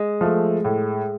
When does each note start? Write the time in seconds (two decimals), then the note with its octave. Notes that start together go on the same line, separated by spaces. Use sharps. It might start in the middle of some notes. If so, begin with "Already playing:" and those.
Already playing: G#3
0.21 F3 A3
0.65 A2